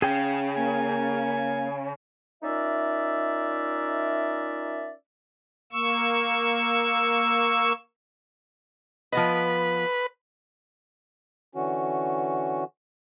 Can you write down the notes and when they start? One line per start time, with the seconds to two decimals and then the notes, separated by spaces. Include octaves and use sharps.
0.02 C#3 G#4 G5
0.56 A#3 G#5
2.43 C#4 D#4 F4 A#4 D5 E5
5.72 A#3 C#6 E6
9.12 F3 B3 B4 D#5
11.55 D3 E3 C#4 F#4